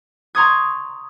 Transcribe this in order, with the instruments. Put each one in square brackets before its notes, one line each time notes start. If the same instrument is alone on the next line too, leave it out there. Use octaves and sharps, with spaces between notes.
[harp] A#5 C6 C#6 D#6 G#6